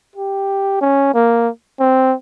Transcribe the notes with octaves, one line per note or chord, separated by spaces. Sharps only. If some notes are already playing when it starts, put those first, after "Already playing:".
G4
C#4
A#3
C4